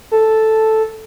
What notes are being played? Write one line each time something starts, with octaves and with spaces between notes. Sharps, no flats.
A4